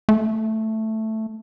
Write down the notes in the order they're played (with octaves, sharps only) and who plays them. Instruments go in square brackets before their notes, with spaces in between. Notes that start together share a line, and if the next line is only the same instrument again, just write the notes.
[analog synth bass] A3